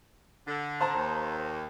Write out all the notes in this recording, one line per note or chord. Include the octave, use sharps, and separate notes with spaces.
D3
C5 A5 A#5
D#2